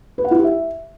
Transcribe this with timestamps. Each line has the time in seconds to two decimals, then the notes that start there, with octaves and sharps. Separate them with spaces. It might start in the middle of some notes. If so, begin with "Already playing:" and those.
0.18 B4
0.25 F#5
0.31 E4
0.38 G4
0.44 E5